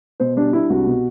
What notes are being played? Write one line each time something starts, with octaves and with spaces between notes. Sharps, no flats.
B2 C5
G3 D4
D4 E4
C2 F#4
B2